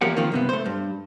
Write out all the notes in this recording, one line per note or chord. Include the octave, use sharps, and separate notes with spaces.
E2 F3 A#3 G4 F#5
D#3 F3 A#3 C4 F4
G2 C3 B3
A3 C5
G2